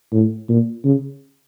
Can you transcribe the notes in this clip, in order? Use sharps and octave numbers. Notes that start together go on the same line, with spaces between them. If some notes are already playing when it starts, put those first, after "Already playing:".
A2
A#2
C#3